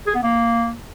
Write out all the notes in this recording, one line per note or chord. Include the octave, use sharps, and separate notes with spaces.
G#4
B3
A#3